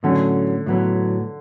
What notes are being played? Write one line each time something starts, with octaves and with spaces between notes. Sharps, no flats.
A2 D3 F#3 A3 C#4
A2 F#3 B3